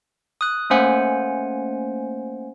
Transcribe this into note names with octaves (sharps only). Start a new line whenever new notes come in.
D#6 F#6
A3 A#3 C#4 C5 F#5 G#5